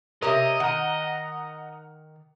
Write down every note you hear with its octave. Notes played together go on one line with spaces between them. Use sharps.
C3 C#4 A#4 D#5 E5 D#6
D#3 F#5 A#5